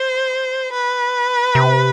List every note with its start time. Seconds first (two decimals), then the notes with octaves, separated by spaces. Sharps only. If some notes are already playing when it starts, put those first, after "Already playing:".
Already playing: C5
0.73 B4
1.55 C3